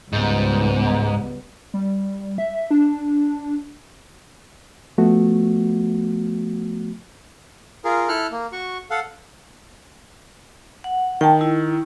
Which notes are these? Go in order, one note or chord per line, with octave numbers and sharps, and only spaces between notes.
C#2 G#2 G3 B3
G3
E5
D4
F3 A3 B3 F#4
F4 G#4 A#4
E4 A4 F6 F#6
A#3
F#4 C#6
A4 F5 F#5
F#5
D#3 G5 A5
E4